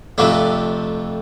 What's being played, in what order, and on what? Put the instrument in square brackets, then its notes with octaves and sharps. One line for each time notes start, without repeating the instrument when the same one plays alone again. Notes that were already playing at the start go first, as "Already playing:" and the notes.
[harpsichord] F2 C3 F3 A3 D4